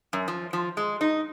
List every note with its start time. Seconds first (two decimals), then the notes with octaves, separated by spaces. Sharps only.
0.13 F#2
0.28 F3
0.53 F3
0.77 G#3
1.01 D#4